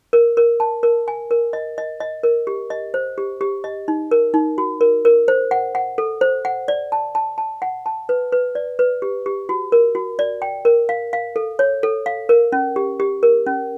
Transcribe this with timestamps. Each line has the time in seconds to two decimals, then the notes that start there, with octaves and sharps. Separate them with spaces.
0.13 A#4
0.37 A#4
0.60 A5
0.83 A#4
1.08 G#5
1.31 A#4
1.53 D#5
1.78 D#5
2.00 D#5
2.23 A#4
2.47 G4
2.70 D#5
2.94 C5
3.18 G4
3.41 G4
3.64 D#5
3.88 D#4
4.11 A#4
4.34 D#4
4.58 F#4
4.81 A#4
5.05 A#4
5.28 C5
5.51 F#5
5.75 F#5
5.98 A4
6.21 C5
6.45 F#5
6.68 D5
6.92 A5
7.15 A5
7.38 A5
7.62 F#5
7.86 A5
8.09 B4
8.32 B4
8.55 D5
8.79 B4
9.02 G4
9.26 G4
9.49 F#4
9.72 A#4
9.95 F#4
10.19 D5
10.42 G5
10.65 A#4
10.89 F5
11.13 F5
11.36 A4
11.59 C#5
11.83 A4
12.06 F5
12.29 A#4
12.52 C#4
12.76 G4
13.00 G4
13.23 A#4
13.46 C#4